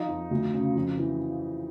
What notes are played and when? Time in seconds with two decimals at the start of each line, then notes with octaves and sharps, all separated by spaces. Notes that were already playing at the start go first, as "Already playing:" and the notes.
Already playing: F3 D#4
0.08 F2
0.31 D2
0.54 C#3
0.76 F2
0.97 E3